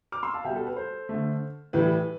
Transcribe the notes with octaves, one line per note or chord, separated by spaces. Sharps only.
D6 F6
C6 E6
F5 A5
B2 G3 E5 G5
A4
B4
A4 C5
D3 A3
A2 E3 G3 B4